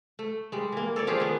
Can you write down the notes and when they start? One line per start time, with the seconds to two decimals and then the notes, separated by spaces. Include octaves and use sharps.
0.19 A3
0.52 G3 G#3
0.72 E3 A#3
0.96 A4 C#5 D5
1.07 F3 F4 G4 G#4
1.20 D#3 B3